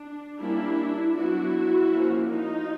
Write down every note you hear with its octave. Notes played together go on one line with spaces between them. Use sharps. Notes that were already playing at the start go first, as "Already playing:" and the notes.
Already playing: D4
G3 A#3 C#4 D4 E4
F#3 B3 D4 E4 F#4
F3 A#3 C#4
D#4 F4